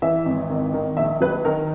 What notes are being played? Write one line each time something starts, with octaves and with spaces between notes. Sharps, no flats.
E3 E5
G#1
D#3
D#3
A#1 E5
F#3 B4
D#3 A#4